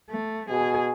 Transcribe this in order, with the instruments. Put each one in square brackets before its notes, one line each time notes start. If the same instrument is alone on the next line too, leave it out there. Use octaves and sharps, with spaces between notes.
[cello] A3
[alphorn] B2 [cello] G#4